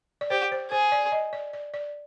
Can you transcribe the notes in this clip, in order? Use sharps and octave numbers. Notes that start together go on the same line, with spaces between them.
D5
G4 C5
C5
G#4 C5
D5
D#5
D5
D5
D5